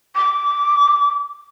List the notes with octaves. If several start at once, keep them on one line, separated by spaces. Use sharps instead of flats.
D6